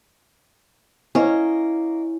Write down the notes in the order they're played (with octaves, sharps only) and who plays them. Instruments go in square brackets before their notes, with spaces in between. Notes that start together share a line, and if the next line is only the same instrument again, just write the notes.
[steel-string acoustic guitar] A#3 D#5 [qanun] C#4 [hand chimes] E4